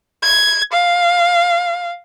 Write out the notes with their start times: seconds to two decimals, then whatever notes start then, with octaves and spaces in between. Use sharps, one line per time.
0.23 G#6
0.73 F5